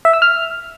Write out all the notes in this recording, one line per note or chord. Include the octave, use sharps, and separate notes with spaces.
E5
E6
F6